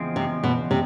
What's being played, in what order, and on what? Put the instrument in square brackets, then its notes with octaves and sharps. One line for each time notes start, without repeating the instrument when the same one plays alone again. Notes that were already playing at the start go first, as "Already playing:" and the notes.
Already playing: [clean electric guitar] E2 C#3 F3 G#3 C4
[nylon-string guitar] C3
B2
C3